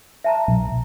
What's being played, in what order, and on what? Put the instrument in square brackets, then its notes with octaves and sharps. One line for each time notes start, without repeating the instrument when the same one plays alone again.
[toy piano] E5 A5 A#5
[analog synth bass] B1